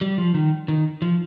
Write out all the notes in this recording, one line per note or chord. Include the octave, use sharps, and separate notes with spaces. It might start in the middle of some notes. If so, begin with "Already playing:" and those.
G3
F3
D#3
D#3
F3